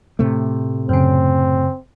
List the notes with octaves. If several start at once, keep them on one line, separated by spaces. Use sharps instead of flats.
A2 C3 A3
F#2 C#3 C4